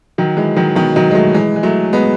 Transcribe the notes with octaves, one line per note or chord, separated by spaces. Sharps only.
D#3 F#3
E3 G#3
D#3 F#3
B2 D#3
D#3 F#3
G#3
F#3 A3
E3 G#3
G#3
F#3 A3
G#3 B3